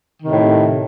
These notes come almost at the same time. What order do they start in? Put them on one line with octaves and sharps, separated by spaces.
D#3 C3 A2